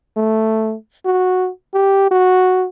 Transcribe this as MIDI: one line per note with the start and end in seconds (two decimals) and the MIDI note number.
0.17 0.75 57
1.05 1.50 66
1.74 2.09 67
2.11 2.66 66